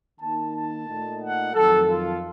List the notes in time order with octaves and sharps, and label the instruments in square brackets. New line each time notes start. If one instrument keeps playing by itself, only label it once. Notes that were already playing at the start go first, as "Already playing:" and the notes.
[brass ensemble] D#3 A#3 D#4 A5
A5
A#2 A3 D#4
F#5
F2 D#3 F#3 A4
F4